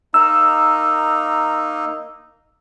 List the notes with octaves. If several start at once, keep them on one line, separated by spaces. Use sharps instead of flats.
A#3 D#4 E6